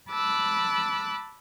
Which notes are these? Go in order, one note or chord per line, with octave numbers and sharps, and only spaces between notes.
A5 B5 D6 E6 F#6